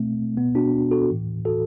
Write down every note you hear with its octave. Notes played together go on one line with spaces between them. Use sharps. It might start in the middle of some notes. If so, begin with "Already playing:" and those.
Already playing: B2 A3 C4
B2 B3
D4 F#4
F#4 A4
A2 E3
F#4 A4